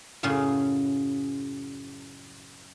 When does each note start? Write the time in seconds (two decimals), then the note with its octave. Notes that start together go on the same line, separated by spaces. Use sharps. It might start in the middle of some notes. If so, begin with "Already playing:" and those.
0.23 F#2 A2 C#3 G#4 F5